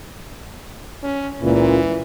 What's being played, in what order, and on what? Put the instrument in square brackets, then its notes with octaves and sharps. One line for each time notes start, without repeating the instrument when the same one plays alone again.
[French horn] C#4
[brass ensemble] C#2 A#2 [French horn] E3